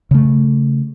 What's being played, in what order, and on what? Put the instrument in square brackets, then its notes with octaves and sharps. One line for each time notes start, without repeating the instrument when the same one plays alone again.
[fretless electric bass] C#3 A3